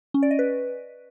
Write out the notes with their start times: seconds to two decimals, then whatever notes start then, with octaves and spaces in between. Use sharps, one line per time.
0.14 C#4
0.23 D5
0.31 D#5
0.39 B4